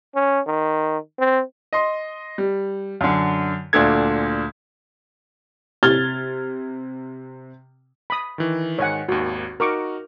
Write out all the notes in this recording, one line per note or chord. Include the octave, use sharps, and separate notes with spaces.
C#4
D#3
C4
D#5 C6
G3
F#2 D3
D2 A#2 D4 A4 G#6
C3 F6 G#6 A6 G7
B5 D#6
D#3 E3
G#2 D#3 C#5 F#5 G#5
G#1 D#2 F#4
D#4 F#4 A#4 C#6 D6 F6